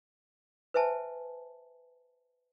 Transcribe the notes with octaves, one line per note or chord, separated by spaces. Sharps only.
B4 C5 E5 G#5 A5